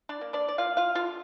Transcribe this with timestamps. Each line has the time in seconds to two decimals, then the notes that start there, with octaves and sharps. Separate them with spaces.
0.09 D4 D5
0.21 A#3
0.33 D4 D5
0.48 D5
0.58 A#3 F4 F5
0.77 F4 F5
0.95 D3 F4 F5